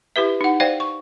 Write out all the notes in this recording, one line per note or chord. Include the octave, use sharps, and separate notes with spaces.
E4 G4 B4 E5
D#4 F#5
C5 D5 F5 G5
C#6